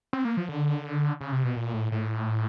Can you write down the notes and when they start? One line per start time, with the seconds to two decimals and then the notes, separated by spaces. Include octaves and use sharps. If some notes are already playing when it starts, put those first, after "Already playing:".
0.13 C4
0.25 A#3
0.37 F3
0.49 D3
1.21 C#3
1.32 C3
1.44 B2
1.56 A#2
1.74 A2
1.92 A2